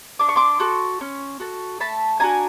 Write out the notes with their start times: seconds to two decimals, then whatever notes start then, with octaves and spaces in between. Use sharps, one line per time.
0.19 D4 D6
0.29 C#6
0.36 C6 D6
0.60 F#4 A4
1.01 C#4
1.40 F#4 A4
1.80 A3 A5 B5
2.20 D4 F#4 G#5 A#5